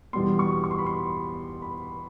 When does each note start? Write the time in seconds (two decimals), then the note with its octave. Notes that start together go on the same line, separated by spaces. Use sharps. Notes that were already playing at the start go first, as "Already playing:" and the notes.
0.13 E2 B2 G3 B3 C6
0.39 C#6
0.64 C#6
0.71 C6
0.78 B5
0.86 C6
1.62 B5